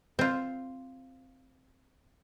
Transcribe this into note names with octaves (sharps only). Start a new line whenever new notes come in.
C4 F4